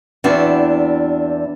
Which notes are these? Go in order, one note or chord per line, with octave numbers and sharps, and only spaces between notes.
E2 B3 C4 D4 F#4